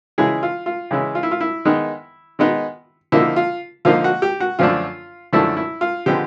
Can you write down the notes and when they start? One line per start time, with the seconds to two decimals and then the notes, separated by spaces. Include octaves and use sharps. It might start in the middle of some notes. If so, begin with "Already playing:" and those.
0.18 C#3 E3 G#3 C#4 E4 G#4
0.43 F4
0.66 F4
0.91 C#3 E3 G#3 C#4 E4
1.15 F4
1.23 E4
1.31 F4
1.41 E4
1.65 D#3 G#3 B3 D#4
2.39 D#3 G#3 B3 D#4
3.12 D3 F3 A#3 D#4 E4
3.36 F4
3.85 D3 F3 A#3 D#4 F4
4.04 F#4
4.22 G4
4.40 F#4
4.59 F#2 D3 F3 A3 D4 F4
5.33 F#2 D3 F3 A3 D4 E4
5.57 E4
5.81 F4
6.06 D3 F3 G#3 B3 G4